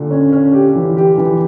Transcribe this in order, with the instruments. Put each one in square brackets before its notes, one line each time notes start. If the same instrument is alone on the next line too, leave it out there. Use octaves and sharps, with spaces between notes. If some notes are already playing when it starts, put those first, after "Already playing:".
Already playing: [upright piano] A#2 D3
[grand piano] C#4
C#4
G4
E3
G4
E3